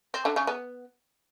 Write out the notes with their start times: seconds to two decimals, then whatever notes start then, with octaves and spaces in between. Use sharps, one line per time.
0.14 C4
0.25 D3
0.36 C#3
0.47 B3